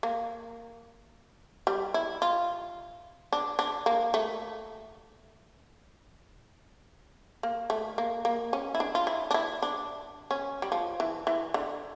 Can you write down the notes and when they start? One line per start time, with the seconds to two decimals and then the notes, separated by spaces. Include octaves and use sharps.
0.03 A#3
1.67 G3
1.94 E4
2.22 F4
3.33 D4
3.59 D4
3.86 A#3
4.14 A3
7.43 A#3
7.70 A3
7.98 A#3
8.25 A#3
8.53 C#4
8.75 E4
8.80 D4
8.95 F4
9.07 E4
9.31 D4
9.34 E4
9.62 D4
10.31 C#4
10.62 G3
10.72 F3
11.00 E3
11.27 E3
11.54 D3